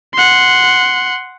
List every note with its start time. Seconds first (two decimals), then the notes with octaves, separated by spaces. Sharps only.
0.14 F#5 C6